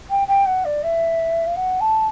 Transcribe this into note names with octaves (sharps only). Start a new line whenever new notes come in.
G5
G5
F#5
D5
E5
F5
F#5
A5